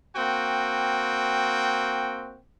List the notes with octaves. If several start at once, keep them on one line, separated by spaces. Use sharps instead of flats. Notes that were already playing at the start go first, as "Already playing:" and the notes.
A#3 C4 F#4 G5